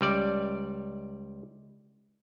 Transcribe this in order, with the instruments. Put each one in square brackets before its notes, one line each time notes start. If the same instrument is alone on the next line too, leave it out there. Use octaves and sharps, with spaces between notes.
[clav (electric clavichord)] C#2 G3 D5